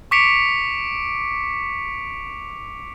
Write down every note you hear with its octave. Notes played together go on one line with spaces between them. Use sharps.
C#6 D6 B6 C#7 D7 F7